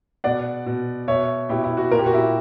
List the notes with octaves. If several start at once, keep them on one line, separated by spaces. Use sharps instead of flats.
B2 D5 F#5
B2
B2 C#5 E5
B2 E4 G4
E4
F#4
A#2 A#4
G4
F#4
E4 G4